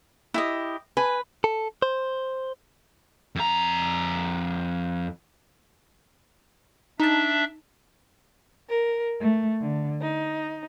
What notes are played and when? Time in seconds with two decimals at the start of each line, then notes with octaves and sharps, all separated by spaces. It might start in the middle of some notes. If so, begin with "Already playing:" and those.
0.34 E4 G4 D#5
0.97 B4 G#5
1.44 A4
1.82 C5
3.36 F2 A#5
7.00 D4 D#4 E5 A5
8.70 A#4
9.20 A3
9.60 D3
10.02 D#4